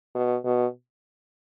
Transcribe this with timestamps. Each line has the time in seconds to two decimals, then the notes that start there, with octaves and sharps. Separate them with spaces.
0.15 B2
0.45 B2